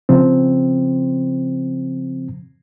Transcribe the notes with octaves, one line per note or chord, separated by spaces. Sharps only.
C#3 F3 C4